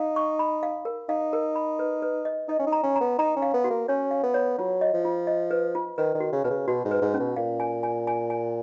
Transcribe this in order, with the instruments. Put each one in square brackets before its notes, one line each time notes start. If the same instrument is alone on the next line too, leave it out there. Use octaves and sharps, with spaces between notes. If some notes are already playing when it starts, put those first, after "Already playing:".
Already playing: [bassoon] D#4 [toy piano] F5
[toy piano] C#6
B5
F5
A#4
[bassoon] D#4 [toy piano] F5
[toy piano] A#4
B5
B4
B4
D#5
[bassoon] D#4 [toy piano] D#5
[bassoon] C#4
D#4
[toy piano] A#5
[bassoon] C#4
[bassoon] B3 [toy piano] A#5
[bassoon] D#4 [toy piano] A#5
[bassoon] C#4
[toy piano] F5
[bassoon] B3
[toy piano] F#4
[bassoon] A#3
[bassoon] C#4 [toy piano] C#5
[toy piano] F5
[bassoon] B3
[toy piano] C#5
[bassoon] F#3 [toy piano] F4
[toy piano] D#5
[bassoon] F3
[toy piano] F4
D#5
B4
F4
[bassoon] D#3 [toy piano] B4
[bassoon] D#3
[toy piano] F#4
[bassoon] C#3
[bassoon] B2 [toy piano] B4
[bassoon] C#3
[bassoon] B2 [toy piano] F#4
[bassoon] G#2
[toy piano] B4
[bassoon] G#2
[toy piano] C#4
[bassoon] B2
[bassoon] A#2 [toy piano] F5
[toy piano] G#5
G#5
G#5
G#5